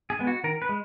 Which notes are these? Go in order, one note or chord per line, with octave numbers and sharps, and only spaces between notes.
G#4
G#3 B3
F#4
D#3 A#4
B4
G#3